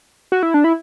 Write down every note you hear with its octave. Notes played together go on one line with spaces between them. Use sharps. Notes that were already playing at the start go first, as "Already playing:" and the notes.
F#4
E4
D4
E4